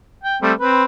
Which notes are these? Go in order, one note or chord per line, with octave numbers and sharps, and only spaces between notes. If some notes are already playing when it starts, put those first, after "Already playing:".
G5
G3 A3 C4
C4 B4